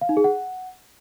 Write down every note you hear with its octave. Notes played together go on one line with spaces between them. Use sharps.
F5
D#4
G#4
F#5